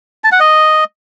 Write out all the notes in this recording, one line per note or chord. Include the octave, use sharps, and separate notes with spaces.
A5
F#5
D#5